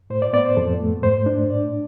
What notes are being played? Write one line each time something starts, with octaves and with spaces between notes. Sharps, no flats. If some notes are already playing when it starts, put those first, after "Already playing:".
A2 C5
D5
B3 D5
C5
F2 A4
A3
G#2 C5
D4
A2 D5